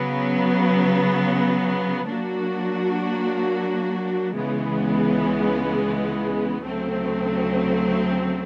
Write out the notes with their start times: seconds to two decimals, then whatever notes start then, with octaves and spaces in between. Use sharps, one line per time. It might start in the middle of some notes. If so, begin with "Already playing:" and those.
Already playing: C#3 F#3 B3
2.08 F#3 A#3 D4 F#4
4.35 C#2 C#3 E3 G#3 B3
6.62 D2 C#3 F#3 A3 C4